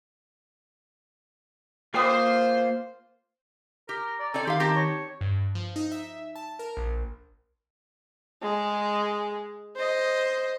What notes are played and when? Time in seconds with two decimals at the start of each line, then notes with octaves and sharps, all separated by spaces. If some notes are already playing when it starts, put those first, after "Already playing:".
1.94 A#3 F4 C5 G5 D6 D#6
3.89 G4 A#4
4.20 D5 A#5
4.34 C4 C#4 A4 D5
4.47 D#3 G4 F5 C6
4.60 C4 G4 A5 A#5
4.76 C#5
5.21 G2
5.55 F3
5.76 D#4
5.92 E5
6.36 A5
6.59 A#4
6.77 A#1
8.43 G#3 G#4
9.76 C5 D#5